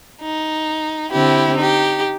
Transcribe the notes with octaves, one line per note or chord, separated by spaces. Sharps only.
D#4
D3 C4 E4 G4
D#4 G4